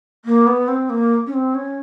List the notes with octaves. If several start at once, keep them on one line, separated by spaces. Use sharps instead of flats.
A#3
B3
C4
A#3
C#4
C4
C#4